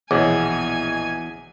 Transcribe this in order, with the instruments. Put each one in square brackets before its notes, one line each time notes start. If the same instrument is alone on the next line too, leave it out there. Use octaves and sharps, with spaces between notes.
[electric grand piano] A#1 B2 D#5 [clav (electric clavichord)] E2 [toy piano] G#4 C#5 [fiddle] G#5